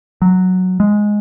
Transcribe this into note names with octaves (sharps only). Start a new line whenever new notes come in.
F#3
G#3